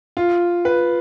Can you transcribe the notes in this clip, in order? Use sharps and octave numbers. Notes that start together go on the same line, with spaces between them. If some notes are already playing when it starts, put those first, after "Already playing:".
F4
B4